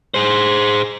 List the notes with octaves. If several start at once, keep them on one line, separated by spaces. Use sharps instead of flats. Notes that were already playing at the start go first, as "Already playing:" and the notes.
G#4 C5